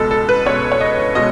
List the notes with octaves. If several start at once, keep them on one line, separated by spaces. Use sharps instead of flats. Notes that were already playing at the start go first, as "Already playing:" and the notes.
Already playing: C#2 B2 G#3 A4
A4
B4
C#2 B2 G#3 C#5
C#5
D#5
B2 G#3 D#5